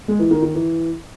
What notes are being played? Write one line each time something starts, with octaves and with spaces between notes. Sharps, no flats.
G#3
E3
D#3
D#3
E3